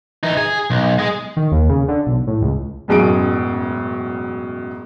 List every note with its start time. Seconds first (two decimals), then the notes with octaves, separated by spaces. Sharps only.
0.23 E3 D#4
0.37 G#4
0.70 B1
0.98 G#3 G#4
1.37 D#3
1.52 D#2
1.70 C#3
1.88 D3
2.07 B1
2.27 A2
2.42 C#2
2.88 E1 A1 F#2 G#4 D7